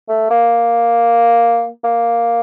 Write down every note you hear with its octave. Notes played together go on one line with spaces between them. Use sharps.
A3
A#3
A#3